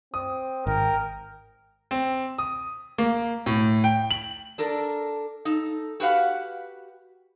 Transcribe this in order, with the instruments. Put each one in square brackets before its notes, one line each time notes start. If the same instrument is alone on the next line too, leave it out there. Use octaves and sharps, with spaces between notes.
[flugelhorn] C4 [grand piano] D#6
[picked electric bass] G#1 [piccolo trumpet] A#4 [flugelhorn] G5
[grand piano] C4
D#6
A#3
A2
G5
F#7
[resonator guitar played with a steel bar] D4 A4 A#4
D#4 A4
F#4 G4 B4 F5 F#5